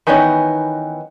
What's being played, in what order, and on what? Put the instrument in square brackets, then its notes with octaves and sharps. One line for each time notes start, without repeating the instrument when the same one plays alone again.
[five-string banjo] D#3 E3 B3 C#4 D#4